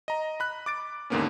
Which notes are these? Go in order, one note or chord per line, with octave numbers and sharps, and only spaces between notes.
D#5 A#5
B5 F#6
D6 A6 D7
D#2 G#2 D3 A#3 B3 C#4